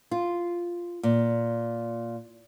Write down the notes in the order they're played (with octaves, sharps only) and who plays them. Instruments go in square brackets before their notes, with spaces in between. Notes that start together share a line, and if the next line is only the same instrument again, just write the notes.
[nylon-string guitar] F4
A#2